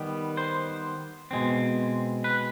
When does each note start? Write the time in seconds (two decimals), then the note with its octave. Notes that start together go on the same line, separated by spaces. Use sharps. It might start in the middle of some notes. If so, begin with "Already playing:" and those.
Already playing: D#3 G3 B3
0.37 C5
1.31 B2 G#3 C4
2.24 B4